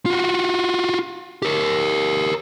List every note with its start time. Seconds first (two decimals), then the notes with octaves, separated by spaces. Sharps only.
0.06 F4 F#4
1.42 G4 A#4